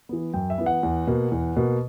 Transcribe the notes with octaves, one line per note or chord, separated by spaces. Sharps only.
E3 B3
F#2 G5
E5
E3 B3
F#5
E2
B2 A#3
E2
B2 A#3